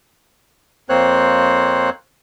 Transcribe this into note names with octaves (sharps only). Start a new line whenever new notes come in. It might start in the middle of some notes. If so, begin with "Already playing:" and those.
F2 A#3 C4 C5 C#5 F#6